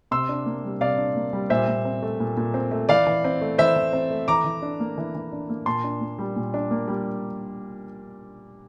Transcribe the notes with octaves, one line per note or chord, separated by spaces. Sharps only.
C3 C6 E6
D4
A#3
G3
C3 D5 F5
D4
A#3
G3
A#2 C5 E5
A#2
C4
A3
A#2
A#2
C4
A3
E3 D5 F5
E3
C4
A3
E3 C5 E5
E3
C4
A3
E3 A#5 D6
E3
D4
A#3
E3
E3
D4
A#3
A#2 A5 C6
D4
A#3
G3
A#2
D4
A#3
G3